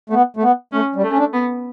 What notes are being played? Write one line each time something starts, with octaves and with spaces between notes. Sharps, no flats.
A3
B3
A3
B3
A3 C#4
G3
A3
C#4
D4
B3